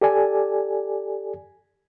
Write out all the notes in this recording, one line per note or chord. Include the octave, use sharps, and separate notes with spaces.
G4 A4 D5 G#5